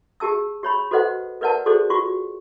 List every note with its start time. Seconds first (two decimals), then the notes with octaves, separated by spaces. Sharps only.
0.20 G4 G#4 A5 E6
0.63 G4 C#5 B5
0.91 F#4 A4 B4 C5 D#5 F#5
1.41 A#4 B4 D5 F#5 A5
1.66 F#4 G#4 A4 C5 D5
1.90 F4 F#4 C#6